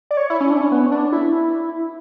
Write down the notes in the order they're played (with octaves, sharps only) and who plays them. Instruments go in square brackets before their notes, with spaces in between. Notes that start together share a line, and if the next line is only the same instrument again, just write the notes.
[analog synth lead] D5
C#5
E4
C#4
D4
C#4
B3
C#4
D4
E4